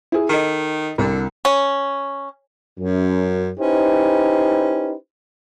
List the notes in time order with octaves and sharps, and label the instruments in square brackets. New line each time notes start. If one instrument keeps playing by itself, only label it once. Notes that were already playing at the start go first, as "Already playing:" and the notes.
[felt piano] E4 G#4
[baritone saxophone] D#3 [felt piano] A4 D#5
[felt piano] C2 [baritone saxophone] D3
[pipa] C#4
[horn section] F#2
C#4 D#4 E4 G4 B4 C5